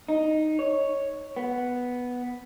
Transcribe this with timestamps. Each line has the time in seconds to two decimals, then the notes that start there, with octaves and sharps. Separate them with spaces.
0.08 D#4
0.59 C#5
1.36 B3